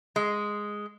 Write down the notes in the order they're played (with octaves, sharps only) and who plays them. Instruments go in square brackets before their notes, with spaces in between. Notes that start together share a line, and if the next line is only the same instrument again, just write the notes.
[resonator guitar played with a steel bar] G#3